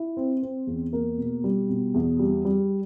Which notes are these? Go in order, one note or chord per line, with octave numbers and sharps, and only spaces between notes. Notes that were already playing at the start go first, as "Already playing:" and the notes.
Already playing: E4
C4
C4
E2
A#3
B2
G3
B2
E2
G3
G3